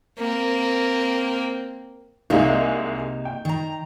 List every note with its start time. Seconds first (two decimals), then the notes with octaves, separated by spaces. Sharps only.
0.18 A#3 C4
2.30 C2 C3 G#3 A#3 D#4
3.25 G5
3.45 D#3 A#5